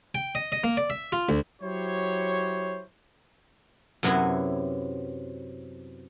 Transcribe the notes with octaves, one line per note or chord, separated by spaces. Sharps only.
G5
D#5
D#5
A#3
D5
E5
F4
D2
F#3 E4 G4 C5 C#5
F#2 C3 F#3 B3 E4